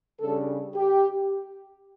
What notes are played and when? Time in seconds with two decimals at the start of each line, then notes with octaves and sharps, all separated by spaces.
0.20 C#3 G3 D4 A4
0.75 G4